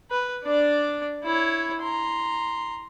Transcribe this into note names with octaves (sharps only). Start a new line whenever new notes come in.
B4
D4 D5
E4 C#5
A#5 C6